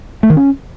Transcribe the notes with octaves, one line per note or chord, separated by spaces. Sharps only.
A3
D#3
C#4